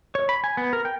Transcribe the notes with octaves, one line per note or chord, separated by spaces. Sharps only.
C#5
B5
G#5
B3
A#4
G5